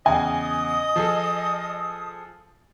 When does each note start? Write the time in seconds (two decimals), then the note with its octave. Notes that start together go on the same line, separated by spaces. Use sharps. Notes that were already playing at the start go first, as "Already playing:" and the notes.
0.06 E2 C#3 D#5 G#5 D#6
0.96 F3 G#4 A4